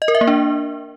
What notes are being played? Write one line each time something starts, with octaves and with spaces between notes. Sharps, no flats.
D#5
A#4
E5
A#3
D4